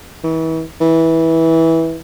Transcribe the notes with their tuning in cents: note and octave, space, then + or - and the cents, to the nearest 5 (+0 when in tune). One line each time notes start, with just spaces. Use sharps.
E3 -35
E3 -15